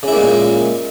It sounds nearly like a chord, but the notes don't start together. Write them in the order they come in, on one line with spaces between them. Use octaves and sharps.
C#3 E4 A#3 G#3 A#2